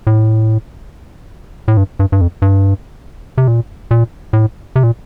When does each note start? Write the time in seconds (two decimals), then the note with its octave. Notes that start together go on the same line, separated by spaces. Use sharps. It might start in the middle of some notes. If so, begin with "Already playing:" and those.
0.07 A2
1.68 A2
1.77 G2
1.99 G2
2.12 G2
2.21 F2
2.42 G2
3.38 C3
3.48 A#2
3.91 A#2
4.33 A2
4.76 C3
4.83 A#2